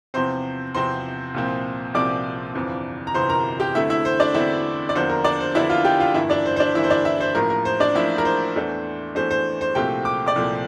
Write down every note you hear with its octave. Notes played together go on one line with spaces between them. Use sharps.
E2 C3 F3 C4 C5 C6
E2 C3 F3 C4 C5 C6
C2 A#2 F3 C4
C2 A#2 F3 C4 D5 D6
G1 F2 C3 E3
A#5
G1 F2 C3 E3 C5 C6
A#4 A#5
G4 G5
E2 D3 A3 C4 E4 E5
E4 E5
C5
D4 D5
E2 D3 A3 C4 E4 E5
D5
E2 D3 F3 A#3 D4 C5
A#4
D4 D5
C5
E2 D3 F3 A#3 D4 E4 E5
F4 F5
G4 G5
F4 F5
G1 G2 E3 A#3 E4 E5
D4 D5
C5
C5
D4 D5
G1 G2 E3 A#3 E4 E5
C5
D4 D5
E4 E5
C5
A1 A2 F3 A#3 A#4
A#4
C5
D4 D5
A1 A2 F3 A#3 E4 E5
A#4
C5
E2 E3 A3 D4
E2 E3 A3 D4 C5
C5
C5
C2 A#2 F3 A3 C4 G4 G5
D6
D5 D6
C2 A#2 F3 A3 C4